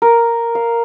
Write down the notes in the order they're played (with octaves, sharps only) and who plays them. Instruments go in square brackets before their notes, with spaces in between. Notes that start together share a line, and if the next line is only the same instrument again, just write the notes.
[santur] A#4
F5